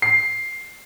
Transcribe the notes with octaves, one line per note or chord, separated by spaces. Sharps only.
C7